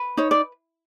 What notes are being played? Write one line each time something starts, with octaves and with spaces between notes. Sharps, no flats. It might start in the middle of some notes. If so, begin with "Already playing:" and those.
Already playing: B4
D#4 C#5
D5